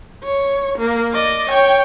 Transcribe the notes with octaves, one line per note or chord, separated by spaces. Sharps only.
C#5
A#3
D5 D#5
C#5 G5